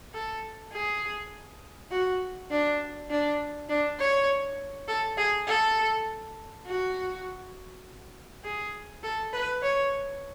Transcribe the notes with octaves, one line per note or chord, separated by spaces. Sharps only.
A4
G#4
F#4
D4
D4
D4
C#5
A4
G#4
A4
F#4
G#4
A4
B4
C#5